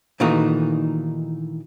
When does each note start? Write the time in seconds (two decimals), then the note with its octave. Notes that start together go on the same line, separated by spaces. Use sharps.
0.20 A#2 D#3 E3 A3 D#4 F#4